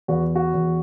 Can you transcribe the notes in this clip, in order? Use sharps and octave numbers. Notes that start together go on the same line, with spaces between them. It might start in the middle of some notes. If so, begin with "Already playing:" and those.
E2 F#4
F#4
E2